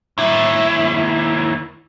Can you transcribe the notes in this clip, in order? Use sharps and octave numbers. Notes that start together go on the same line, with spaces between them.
D#2 E4